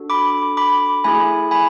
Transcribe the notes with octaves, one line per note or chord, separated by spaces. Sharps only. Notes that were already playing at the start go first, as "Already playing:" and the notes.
Already playing: D4 F#4 A4
B5 D6
B5 D6
A3 E4 G#4 G#5 B5
G#5 B5